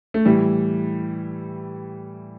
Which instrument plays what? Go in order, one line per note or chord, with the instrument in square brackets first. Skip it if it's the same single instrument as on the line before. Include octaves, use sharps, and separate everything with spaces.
[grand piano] A3
A2 E3 G3